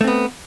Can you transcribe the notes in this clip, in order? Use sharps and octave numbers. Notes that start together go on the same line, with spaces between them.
A3 B3 C4